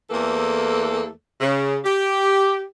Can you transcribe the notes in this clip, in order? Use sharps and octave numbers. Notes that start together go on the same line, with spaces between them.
E2 E3 A3 A#3 A4
C#3
G4